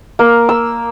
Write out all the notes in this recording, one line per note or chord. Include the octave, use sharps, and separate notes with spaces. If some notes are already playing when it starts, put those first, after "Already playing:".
A#3
E6